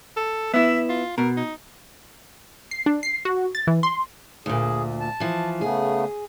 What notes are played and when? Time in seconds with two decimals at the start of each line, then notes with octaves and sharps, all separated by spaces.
0.17 A4
0.54 B3 E4 E5
0.89 F4
1.18 B2 A#4
1.37 D#4
2.71 C7
2.86 D4
3.03 C7
3.25 F#4
3.55 A6
3.67 E3
3.83 C6
4.46 D2 A#2 G#4
5.00 A5
5.20 E3 F3
5.61 C#3 A3 B3 G#4